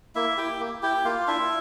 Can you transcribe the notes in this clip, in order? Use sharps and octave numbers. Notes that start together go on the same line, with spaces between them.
A#3 E4 E5
E4 G4 G5
A#3
E4 G4 G5
A#3 F4 F5
D4 E4 F4 E5